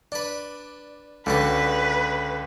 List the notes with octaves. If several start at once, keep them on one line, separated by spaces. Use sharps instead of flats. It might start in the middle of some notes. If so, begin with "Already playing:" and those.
D4 B4 D5
C#2 D3 D4 F#4 B4